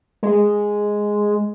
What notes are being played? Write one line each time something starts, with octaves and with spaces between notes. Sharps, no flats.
G#3